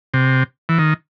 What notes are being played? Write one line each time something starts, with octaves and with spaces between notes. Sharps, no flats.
C3
E3
D#3